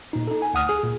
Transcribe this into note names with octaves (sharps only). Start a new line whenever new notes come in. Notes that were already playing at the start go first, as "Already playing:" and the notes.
A#2 D#4
D#4 A4
G#5
D2 F#5 D#6 F6
G#4
A#2